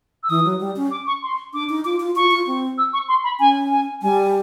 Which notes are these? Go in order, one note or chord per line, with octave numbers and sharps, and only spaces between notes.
E6
E3 D#6
F#3
G3
C#4
D6
C#6
C6
D4 D6
D#4
F4 D6
F4
F4 C#6
F4
C4
E6
C#6
C6
B5
C#4 G#5
G#5
G3 G#5